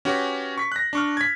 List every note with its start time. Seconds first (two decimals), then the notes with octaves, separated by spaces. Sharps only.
0.05 C#4 F#4 G4 B4
0.58 C#6 B6
0.72 F#6 A#6
0.93 D4 C#6 F6
1.17 G#6 B6